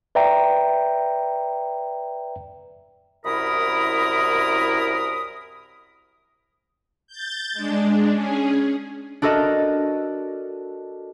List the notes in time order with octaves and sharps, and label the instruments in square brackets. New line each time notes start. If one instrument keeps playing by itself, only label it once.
[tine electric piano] B4 D5 E5 G5 A#5
[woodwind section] C2 F#2 E4 A#4 B5 D#6
[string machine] G6 A6
G#3 D4
C#4 G#4
[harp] D4 F#4 A4 A#4 D#5